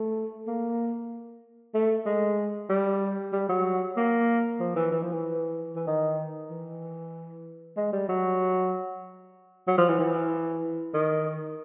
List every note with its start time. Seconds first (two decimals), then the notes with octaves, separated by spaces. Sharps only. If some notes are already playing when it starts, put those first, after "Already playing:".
Already playing: A3
0.47 A#3
1.75 A3
2.06 G#3
2.70 G3
3.33 G3
3.49 F#3
3.97 A#3
4.60 F3
4.76 E3
4.92 E3
5.02 F3
5.13 E3
5.76 E3
5.87 D#3
6.51 E3
7.77 G#3
7.93 G3
8.09 F#3
9.68 F#3
9.78 F3
9.89 E3
9.99 E3
10.94 D#3